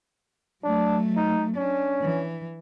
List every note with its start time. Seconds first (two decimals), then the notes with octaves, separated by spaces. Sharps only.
0.64 F#3 A3 D4
1.16 D#4
1.57 C#4 D4
2.02 E3